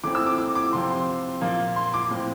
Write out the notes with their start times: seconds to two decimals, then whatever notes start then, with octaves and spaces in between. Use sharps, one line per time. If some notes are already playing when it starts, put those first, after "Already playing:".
0.04 E3 A3 C4 D6
0.15 E6
0.27 D6
0.38 D6
0.55 D6
0.73 C3 F3 C4 C6
0.90 C6
1.41 A#2 F3 A#3
1.76 C6
1.94 D6
2.11 A2 F3 C4